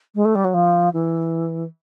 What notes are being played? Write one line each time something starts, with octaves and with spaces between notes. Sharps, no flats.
G#3
A3
G3
F#3
F3
E3